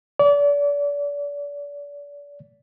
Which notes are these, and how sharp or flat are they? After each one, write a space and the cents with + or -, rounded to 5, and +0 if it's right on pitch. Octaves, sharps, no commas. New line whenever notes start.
D5 -35